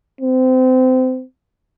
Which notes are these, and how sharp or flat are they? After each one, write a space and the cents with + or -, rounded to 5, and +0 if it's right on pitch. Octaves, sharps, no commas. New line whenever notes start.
C4 -25